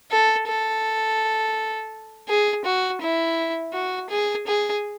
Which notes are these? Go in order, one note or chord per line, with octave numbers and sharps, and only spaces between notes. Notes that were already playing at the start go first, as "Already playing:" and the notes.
A4
A4
G#4
F#4
E4
F#4
G#4
G#4